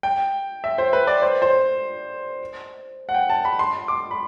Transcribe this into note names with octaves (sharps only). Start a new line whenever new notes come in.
G5
E5
C5
B4
D5
C5
C5
F#5
G5
A5
B5
C6
D6
B5